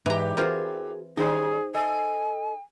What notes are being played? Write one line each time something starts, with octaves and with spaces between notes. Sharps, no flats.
E2 G#2 E3 G4 A#5
E3 C4 F4 F#4 G#4 A#4
D#3 G3 C#4 D#4 G#4 C5
A4 D#5 G#5